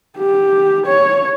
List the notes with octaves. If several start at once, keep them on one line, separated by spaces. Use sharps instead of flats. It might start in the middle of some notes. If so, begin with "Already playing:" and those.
G4
C#5